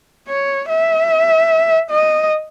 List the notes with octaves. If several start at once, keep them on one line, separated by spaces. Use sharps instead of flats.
C#5
E5
D#5